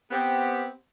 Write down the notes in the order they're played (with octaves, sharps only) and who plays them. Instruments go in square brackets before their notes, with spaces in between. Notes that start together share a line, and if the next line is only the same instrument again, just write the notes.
[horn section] B3 C4 G4